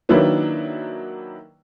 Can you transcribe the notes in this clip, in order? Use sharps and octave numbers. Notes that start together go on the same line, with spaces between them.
D#3 F#3 A#3 D4 E4 B4